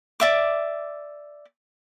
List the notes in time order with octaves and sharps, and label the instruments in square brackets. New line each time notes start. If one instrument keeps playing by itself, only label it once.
[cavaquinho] D5 E5 D6